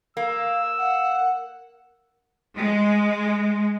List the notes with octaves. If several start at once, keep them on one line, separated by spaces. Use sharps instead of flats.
A#3 F5 E6
F5 F#5
A#4
G#3